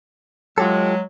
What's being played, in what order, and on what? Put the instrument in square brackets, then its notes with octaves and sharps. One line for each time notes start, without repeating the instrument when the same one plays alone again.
[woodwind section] F#3 G#3 [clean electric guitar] F4 G4 A4